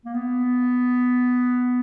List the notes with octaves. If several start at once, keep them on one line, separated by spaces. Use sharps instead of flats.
A#3
B3